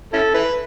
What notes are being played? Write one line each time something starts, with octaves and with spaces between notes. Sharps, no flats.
C#4 E4 A4
E4 B4